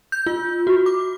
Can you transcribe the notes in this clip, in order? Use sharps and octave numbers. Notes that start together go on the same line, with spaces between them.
G6
F4
F#4
D6